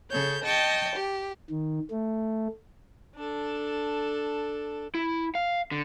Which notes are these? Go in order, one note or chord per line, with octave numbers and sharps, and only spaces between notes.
C#3 A4 C#5 G6
D#5 G5 A5 C#6
G4
D#3
A3
D4 A4
E4
F5
D3